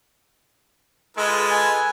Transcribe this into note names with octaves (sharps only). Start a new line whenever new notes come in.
G#3 F4 A4 B4
G#5